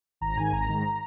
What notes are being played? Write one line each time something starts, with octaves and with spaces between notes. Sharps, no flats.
G#1 A#5
G#2 D#3 G#5
G#1 A#5
G#2 D#3